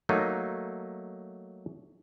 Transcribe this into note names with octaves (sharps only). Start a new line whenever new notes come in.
F#3 A3 A#3 D#4